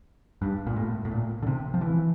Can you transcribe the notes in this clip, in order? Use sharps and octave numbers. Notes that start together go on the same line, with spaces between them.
G2
A#2
A2
A2
A#2
D3
C3
F3
E3